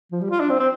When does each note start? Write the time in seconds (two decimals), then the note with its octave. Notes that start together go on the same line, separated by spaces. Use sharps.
0.12 F3
0.21 G3
0.30 F4
0.40 D4
0.49 C4
0.59 C4